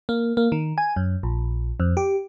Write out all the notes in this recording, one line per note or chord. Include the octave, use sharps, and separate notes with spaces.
A#3
A#3
D#3
G#5
F#2
A#1
F2
G4